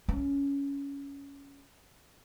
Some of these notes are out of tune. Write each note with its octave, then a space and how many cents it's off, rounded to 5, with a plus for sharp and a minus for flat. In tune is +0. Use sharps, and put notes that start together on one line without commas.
C#4 +15